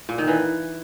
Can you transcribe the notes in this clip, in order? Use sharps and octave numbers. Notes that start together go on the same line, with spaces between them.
A#2
D#3
E3